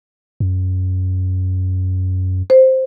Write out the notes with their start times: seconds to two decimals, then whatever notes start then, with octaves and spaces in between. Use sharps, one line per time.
0.40 F#2
2.50 C5